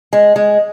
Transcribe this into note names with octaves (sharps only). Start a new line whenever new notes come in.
G#3
G#3